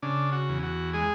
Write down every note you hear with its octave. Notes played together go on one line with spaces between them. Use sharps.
C#3 D4
F#4
E2
F#4
G#3 G#4